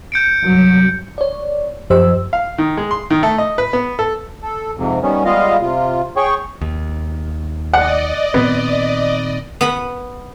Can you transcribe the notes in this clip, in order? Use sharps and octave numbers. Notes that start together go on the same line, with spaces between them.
G6 C#7 D7
C2 G2 F#3
C#5 D5
F#2 F3 G4 C5 D#5 E6
F5
D#3
G#3
C6
D#3
A3
D#5
B4
B3
A4
A4
F2 G#2 C3
D#3 G3 B3 C#4
G3 G#3 B3 F4 D#5 F5
C3 F4
G#4 C#5 G5 C#6
D#2
D5 D#5 F#5 F#6
A#2 D#3 B3 C4
B3 F#5 B5